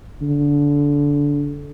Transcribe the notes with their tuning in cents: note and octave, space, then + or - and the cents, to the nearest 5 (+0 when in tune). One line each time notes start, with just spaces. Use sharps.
D3 -20